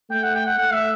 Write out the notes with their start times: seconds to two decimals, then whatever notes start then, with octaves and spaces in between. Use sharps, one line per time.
0.11 A3 G5
0.23 F#5
0.35 G5
0.46 F#5
0.58 A3 F#5
0.73 E5